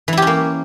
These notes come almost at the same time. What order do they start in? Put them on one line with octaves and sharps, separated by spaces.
E3 E4 G4 C#4 A#3